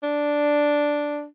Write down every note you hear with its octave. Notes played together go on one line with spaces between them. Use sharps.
D4